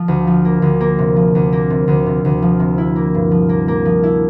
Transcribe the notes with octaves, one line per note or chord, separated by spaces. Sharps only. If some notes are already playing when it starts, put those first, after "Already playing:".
Already playing: F3
D2
F3
A#3
D2
A#3
C3
F3
D2
A#3
C3
D2
C3
D2
F3
C3
E4
A#3
G2
F3
A#3
A#3
F3
E4